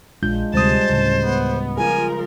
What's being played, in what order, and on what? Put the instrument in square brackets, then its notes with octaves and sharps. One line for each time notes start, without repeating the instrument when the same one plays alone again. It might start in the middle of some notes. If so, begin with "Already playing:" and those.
[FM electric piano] A#1 G6 [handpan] G#3 D4 F4
[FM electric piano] D2 C3 D#6 [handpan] G3 G#3 [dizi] C5 [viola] A5
[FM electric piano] D2 A2 [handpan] C#3
[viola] B3
[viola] F3 A#4 [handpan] F4 G#4 [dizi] G#5